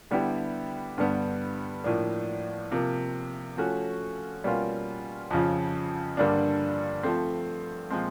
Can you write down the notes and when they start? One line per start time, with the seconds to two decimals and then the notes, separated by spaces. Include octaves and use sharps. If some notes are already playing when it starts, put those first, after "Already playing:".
0.11 D3 G3 B3 E4 G4
0.98 G2 D3 G3 B3
1.84 A2 F3 A#3 D4
2.71 C3 F3 A#3
3.57 F3 A3 C#4 F#4
4.44 B2 G3 A#3 C#4 F4
5.31 F2 C#3 F3
6.17 G2 D3 G3 A#3 D4
7.03 F3 A3 C4
7.90 A#2 F3 G#3 C4